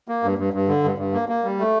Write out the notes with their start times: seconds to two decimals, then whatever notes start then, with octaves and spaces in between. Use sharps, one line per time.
0.08 A#3
0.23 G2
0.38 G2
0.53 G2
0.68 D3
0.84 G2
0.98 G2
1.14 A#3
1.29 A#3
1.44 G3
1.59 A3